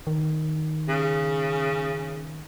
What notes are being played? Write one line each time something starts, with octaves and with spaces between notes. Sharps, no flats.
D#3
C#3